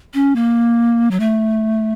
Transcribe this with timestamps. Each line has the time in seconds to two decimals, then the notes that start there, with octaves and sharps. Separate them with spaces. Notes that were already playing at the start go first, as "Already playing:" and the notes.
0.14 C#4
0.36 A#3
1.11 F#3
1.20 A3